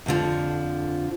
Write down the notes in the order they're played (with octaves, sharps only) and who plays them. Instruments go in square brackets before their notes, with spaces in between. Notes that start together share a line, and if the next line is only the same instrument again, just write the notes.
[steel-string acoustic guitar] F2 D3 F3